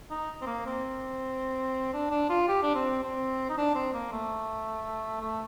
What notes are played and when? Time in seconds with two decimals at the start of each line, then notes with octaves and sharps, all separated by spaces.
0.10 D#4
0.42 C4
0.46 A#3
0.66 C4
1.94 D4
2.11 D4
2.29 F4
2.48 G4
2.63 D4
2.75 C4
3.03 C4
3.49 D#4
3.58 D4
3.75 C4
3.93 A#3
4.12 A3
5.21 A3